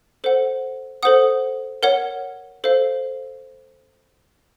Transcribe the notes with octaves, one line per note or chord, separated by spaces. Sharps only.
A4 C5 F#5
A4 C5 F#5 D#6
A#4 C#5 F#5
A4 C5 F5